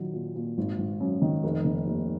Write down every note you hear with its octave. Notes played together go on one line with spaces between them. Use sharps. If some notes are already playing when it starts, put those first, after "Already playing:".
Already playing: A#2 D#3 F#3
A#2
A#2
G#1
G#1
F#2
D#3
F1
D#3
D#2